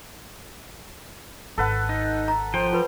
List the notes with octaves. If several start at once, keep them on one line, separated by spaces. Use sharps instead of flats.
G#1 A4 B4 F#5
D#4
A#5
F3 C5 G5
F4 B4 B5